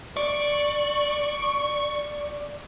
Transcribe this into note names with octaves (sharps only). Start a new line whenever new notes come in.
D5 C#6